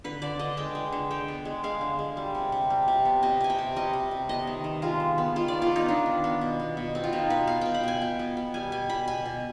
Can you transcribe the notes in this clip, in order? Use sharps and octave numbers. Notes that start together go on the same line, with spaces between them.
D3 B4
D3 D5
D3 D#5
G#3 G5
G#3
D3
D3 G5
B3
G#3
G#3 F5
D3
G#3
G3
C3
C3
G3
C3
B3
C3 D#5
C3 G#5
G5
C3
G3 D#5
C3
C3
B3 D#5
D#3
D#3
G#3 F4
D#3
B3
D#3 F4
D5
B3
F4
B3 D#4
B3 D4
D#3
B3
B2
B3
B2
B3 C4
F4
B2 D#4
B2 B4
B3 F5
B2 G5
B5
B2 G#5
B2 G5
B3
B3
G3 G#5
B2 G#5
B2 B5
B2 G#5
B2